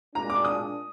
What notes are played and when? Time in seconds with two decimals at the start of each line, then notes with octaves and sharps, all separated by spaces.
0.15 A#2 G#3 D4 A#5
0.30 D6
0.44 D#6